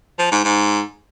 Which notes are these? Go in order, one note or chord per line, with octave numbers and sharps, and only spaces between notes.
F3
G#2
G#2